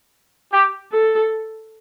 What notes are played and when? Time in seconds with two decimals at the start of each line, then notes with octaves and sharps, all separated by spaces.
0.53 G4
0.92 A4